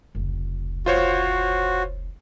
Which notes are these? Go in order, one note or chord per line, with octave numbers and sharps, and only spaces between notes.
F1 C#2
F4 F#4 C5 C#5